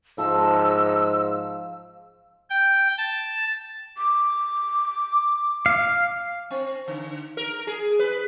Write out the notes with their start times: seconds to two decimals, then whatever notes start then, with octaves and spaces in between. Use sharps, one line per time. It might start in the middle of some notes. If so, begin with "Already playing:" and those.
0.18 G#2 F3 E6
2.50 G5
2.98 A5
3.97 D6
5.66 F5
6.51 C4
6.88 D3
7.37 A#4
7.67 G#4
7.99 B4